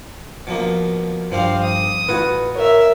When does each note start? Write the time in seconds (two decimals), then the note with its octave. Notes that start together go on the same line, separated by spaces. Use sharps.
0.47 B2 F3 A#3
1.32 G2 F3 G3 C4 C5 F5
1.63 D#6
2.09 A1 A2 F4 F#4 G#4 B4
2.56 A#4 C#5 E5